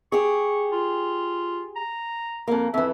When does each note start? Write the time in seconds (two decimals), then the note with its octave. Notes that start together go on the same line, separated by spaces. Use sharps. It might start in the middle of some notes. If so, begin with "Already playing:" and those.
0.12 G4 G#4 C#6
0.72 F4
1.76 A#5
2.48 F2 A#3
2.74 F2 E3 E5